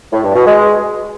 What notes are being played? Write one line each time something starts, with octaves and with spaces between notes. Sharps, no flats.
A2
G2
B2
G#3